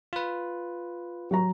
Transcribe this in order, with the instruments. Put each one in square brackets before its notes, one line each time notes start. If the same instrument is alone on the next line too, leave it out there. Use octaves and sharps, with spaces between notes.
[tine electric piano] F4 B4
[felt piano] F#3 F#4 A#5